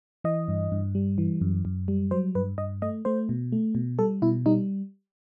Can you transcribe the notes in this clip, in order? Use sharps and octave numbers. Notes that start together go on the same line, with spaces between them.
E3 D#5
G2
G2
G3
E3
F#2
F#2
G3
F#3 C5
G2 B4
G2 D#5
A3 D#5
A3 C5
B2
A3
B2
G3 A4
B2 E4
G3 D#4